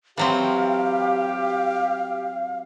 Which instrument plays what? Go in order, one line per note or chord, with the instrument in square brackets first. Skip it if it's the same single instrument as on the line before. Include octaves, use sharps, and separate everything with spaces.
[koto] E3 F#3 C4 [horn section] G4 [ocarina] F5